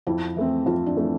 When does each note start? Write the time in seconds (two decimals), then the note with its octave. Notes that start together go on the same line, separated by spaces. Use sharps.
0.07 F2 E4
0.36 E3 A3 C4
0.66 F2 F4
0.86 D4
0.96 E3 A3 C4